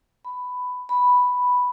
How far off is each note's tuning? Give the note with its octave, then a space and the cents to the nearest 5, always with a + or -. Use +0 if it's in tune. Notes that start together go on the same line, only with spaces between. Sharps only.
B5 +10
B5 +0